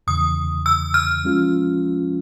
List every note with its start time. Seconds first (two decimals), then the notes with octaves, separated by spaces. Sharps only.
0.07 E2 C#3 E3 D#6
0.66 E6
0.94 F6
1.24 F3 G#3 C#4 F4